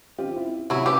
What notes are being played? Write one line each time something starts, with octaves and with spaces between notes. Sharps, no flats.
C4 F4 G4
E4
C3 F#3 E4
G4 B4 G#5 B5